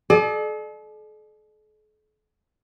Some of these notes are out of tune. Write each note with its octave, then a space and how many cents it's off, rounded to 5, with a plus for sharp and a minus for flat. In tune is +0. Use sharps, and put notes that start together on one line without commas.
A4 -45 D5 +40